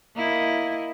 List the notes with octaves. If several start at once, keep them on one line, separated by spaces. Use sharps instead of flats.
A#3 E4 D#5